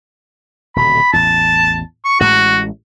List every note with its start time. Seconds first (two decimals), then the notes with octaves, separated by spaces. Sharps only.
0.76 D#1 B2 D3 B5
1.13 A1 E2 A5
2.05 C#6
2.20 A1 A2 G#3 F#4